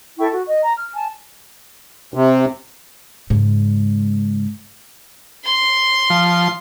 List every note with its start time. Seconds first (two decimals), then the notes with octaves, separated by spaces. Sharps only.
0.19 E4 A4 G5 C#6
0.32 F#4
0.47 D#5
0.61 A#5
0.76 F6
0.94 G#5 A5
2.14 C3
3.30 G#2 C#3
5.45 C6
6.10 F3